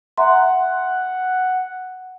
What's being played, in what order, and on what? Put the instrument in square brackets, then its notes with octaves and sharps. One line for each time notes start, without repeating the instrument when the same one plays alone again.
[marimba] E5 A#5 C6 [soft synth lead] F#5